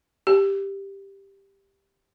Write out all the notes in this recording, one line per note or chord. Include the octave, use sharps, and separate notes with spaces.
G4